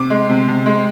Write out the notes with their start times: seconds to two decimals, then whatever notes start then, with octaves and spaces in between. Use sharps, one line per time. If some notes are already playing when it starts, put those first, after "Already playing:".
Already playing: C3 D6
0.10 G#3
0.29 C3
0.48 C3
0.66 G#3